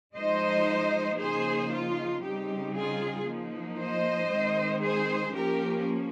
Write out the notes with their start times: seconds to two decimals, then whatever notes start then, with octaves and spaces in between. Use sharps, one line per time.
0.15 F3 G#3 D#4 C5 D#5
1.19 C#3 F3 A#3 D#4 G#4 C5
1.70 F4
2.22 C#3 G3 C4 D#4 G4
2.74 F4 G#4
3.26 F3 A#3 D#4
3.78 C5 D#5
4.30 D#3 G#3 C4 D#4
4.81 G#4 C5
5.33 F3 A#3 C#4 G4 A#4